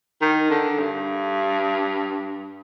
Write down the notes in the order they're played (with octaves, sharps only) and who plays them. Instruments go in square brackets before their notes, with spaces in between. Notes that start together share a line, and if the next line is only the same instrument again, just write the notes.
[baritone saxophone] D#3
D3
G2